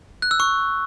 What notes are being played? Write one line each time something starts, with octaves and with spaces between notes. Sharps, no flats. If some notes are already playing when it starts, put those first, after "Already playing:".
F#6
E6
C#6